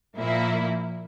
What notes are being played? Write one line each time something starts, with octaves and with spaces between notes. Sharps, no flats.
A#2 F3 A#3 E4